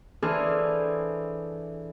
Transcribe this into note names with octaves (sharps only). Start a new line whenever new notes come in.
E3 D4 G#4 A4 C5 F6